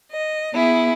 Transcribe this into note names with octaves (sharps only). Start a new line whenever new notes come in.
D#5
B3 E4 G#4